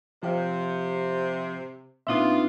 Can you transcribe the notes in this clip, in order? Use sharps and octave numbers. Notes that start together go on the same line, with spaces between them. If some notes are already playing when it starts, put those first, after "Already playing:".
C3 F3 G4 F5
A#2 B3 C4 D4 D#4 F4 E5